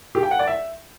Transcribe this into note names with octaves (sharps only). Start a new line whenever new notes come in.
G4
G5
F#5
D5
E5